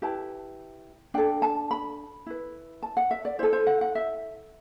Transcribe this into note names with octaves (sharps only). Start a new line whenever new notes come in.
E4 G4 B4 A5
D4 A4 G5
A5
B5
E4 B4
A5
F#5
E5
D5
E4 A4 C5
C5
F#5
F#5
E5